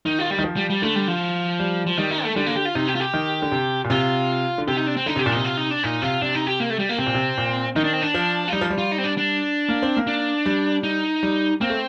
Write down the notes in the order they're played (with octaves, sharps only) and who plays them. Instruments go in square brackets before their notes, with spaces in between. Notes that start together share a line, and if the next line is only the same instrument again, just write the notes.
[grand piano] D#3 [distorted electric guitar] D#4
[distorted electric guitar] F4
G3
[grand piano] D#3
F3
[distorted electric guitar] G3
G3
[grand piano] D3 [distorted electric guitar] A3
[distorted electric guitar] G3
F3
[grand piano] G3
[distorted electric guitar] F3
[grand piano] D#3 [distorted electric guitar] G3
[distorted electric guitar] D#4
A3
[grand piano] D3 [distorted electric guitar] G3
[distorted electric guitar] A#3
G4
F4
[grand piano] C3 [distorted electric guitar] D#4
[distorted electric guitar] G4
F4
G4
[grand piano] D#3
D3
C3
A#2
[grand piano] C3 [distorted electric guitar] F4
[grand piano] D3
[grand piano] C3 [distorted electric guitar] G4
[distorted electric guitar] D#4
D4
C4
[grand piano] D3 [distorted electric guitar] D#4
[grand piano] C3 [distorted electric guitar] G4
[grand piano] A#2 [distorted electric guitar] D4
[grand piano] C3 [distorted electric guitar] D#4
[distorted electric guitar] F4
D#4
D4
[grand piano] A#2 [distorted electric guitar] D#4
[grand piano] C3 [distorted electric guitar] F4
[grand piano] C3 [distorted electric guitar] D4
[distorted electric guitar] D#4
G4
A#3
A3
G3
A#3
[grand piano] C3 [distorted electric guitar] C4
[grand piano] A#2
C3
A#2
[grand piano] D#3 [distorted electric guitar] D#4
[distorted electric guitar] D4
C4
D4
[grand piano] F3
[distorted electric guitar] F4
[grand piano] G3 [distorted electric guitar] D#4
[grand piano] F3
G3
[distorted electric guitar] F4
D#4
C4
D4
D4
[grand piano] A#3
C4
A#3
[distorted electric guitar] D4
[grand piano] G3
[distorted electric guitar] D#4
[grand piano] G3
[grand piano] A#3 [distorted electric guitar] C4
[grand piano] A3